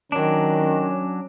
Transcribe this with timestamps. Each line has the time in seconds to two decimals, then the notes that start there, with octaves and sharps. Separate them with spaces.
0.12 D#3 F#3 C#4 D4